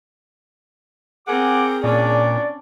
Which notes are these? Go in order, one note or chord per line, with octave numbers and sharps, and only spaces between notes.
C4 G#4 A#4 F#5 G#5 D6
A#2 C#4 D4 D5